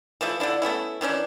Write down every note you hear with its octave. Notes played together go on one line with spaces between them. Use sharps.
E3 F3 A3 E4
D3 F3 D4 E4
A3 B3 C#4 E4
D#3 E3 C#4 D4